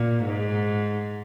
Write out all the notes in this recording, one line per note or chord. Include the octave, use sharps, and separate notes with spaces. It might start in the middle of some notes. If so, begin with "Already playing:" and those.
Already playing: A#2
G#2